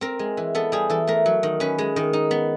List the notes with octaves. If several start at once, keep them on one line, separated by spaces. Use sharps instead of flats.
C4 A#4
G#3
E3
B3 A4
G3 G#4
E3 A4
A3 A#4
F#3
D#3
C#4 B4
G#3
D#3
D#4
B3